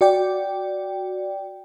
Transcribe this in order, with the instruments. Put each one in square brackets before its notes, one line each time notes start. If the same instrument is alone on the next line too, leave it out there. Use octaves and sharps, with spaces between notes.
[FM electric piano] F#4 D5 G5